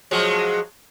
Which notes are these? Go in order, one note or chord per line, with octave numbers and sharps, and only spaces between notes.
F3 F#3 G#3